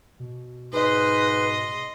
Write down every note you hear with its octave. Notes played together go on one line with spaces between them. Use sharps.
B2
G#2 B4 D#5 C6